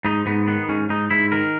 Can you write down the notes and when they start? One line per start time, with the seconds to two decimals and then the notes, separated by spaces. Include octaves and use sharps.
0.05 G#2 D#4
0.26 G#2 B3
0.47 D#3 B3
0.69 G#2 C#4
0.89 G#2 D#4
1.10 G#2 E4
1.32 D#3 A#4